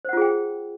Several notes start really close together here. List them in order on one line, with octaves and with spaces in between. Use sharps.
C5 F#5 F4 G#4 G5